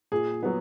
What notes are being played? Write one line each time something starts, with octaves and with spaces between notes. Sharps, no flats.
A#2 G#4
F#3 B3